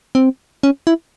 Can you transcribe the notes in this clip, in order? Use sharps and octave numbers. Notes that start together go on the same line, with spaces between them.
C4
C#4
E4